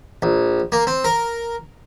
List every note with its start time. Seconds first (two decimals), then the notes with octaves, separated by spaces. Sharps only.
0.22 A#1
0.72 A#3
0.87 C4
1.04 A#4